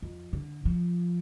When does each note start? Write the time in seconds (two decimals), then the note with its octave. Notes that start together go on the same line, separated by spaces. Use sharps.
0.02 F2
0.33 D3
0.65 F3